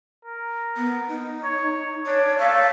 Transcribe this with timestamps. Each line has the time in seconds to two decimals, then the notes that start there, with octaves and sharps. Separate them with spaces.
0.25 A#4
0.77 B3
1.08 D#4
1.44 C#5
2.06 D4 C#5
2.39 A3 F5